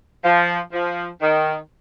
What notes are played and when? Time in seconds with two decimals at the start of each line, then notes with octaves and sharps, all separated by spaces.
0.24 F3
0.72 F3
1.21 D#3